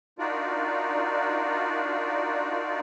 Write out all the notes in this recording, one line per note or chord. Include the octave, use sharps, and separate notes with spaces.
D4 D#4 F4 F#4 A#4 D5